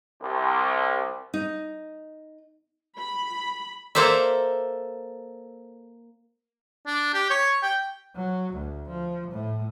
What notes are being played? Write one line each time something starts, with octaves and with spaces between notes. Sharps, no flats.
C2
D#4
B5
A#3 A4 C5 D5 E5
D4
G4
C#5
G5
F#3
D2
F3
A2